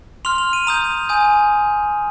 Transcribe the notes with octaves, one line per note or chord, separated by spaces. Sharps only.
C6 F6 F7
F7
D#7
A#5 D#6 G6 F7
G#5 D#6 G6